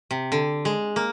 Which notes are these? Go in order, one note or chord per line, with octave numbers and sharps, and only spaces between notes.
C3
D3
G#3
A#3